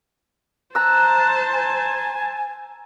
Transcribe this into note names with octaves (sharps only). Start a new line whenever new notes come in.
C5 A5 A#5 E6 F#6
G#5